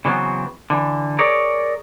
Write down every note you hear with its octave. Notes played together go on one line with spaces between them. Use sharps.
C#3 E3 F#3 B3 C4
D3 E3
G#4 A#4 C#5 D5